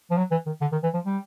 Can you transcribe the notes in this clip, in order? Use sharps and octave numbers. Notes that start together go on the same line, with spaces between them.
F3
F#3
E3
D#3
D3
D#3
E3
F3
G3